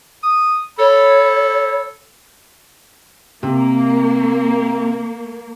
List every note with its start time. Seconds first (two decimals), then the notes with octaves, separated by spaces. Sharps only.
0.23 D#6
0.79 A4 C#5 B5
3.43 C3 A#3